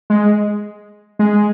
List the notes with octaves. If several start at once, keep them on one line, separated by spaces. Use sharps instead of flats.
G#3
G#3